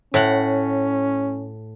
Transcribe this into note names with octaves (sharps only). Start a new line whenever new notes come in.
A2 C#4 F#5